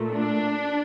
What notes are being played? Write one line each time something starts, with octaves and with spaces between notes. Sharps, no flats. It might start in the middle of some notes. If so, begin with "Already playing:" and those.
Already playing: A#2 A3
D4